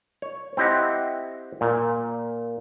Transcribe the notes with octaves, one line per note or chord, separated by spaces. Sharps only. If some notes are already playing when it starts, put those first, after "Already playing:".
C#5
C4 E4 G4 D#5 F#5
A#2